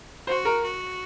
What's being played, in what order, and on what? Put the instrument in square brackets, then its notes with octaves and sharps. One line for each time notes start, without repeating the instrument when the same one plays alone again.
[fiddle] F#4 [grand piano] C5
[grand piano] A#4
[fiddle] F#4